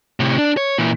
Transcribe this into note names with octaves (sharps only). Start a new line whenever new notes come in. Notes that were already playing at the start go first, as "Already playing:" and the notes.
A2 C3
D4
C#5
A#2 E3